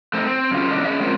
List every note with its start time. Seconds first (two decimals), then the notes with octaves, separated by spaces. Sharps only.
0.13 A3 C4 D#4
0.27 C4
0.51 F#2 C#3 F4
0.71 E2 D3 C#4 D4 D#5
0.84 C#4 G#4 D#5 E5
1.00 G#3 C4 C#4 F4 A#4 C5